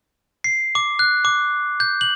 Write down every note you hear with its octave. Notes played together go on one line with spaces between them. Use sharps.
C7
D6
F#6
D6
G6
F#7